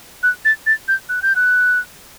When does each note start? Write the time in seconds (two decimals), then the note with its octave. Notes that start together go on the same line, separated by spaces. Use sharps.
0.23 F#6
0.45 A6
0.66 A6
0.88 G6
1.09 F#6
1.22 G6
1.36 F#6